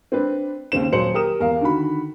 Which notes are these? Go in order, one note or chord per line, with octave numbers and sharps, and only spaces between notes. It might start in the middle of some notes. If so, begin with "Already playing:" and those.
C4 D4 B4
D#2 C#3 C4 E7
D#1 F#3 C5 C#7 F#7
G4 A#4 D#6 E7
E2 A#4 F5
D3 D#3 F#4 B5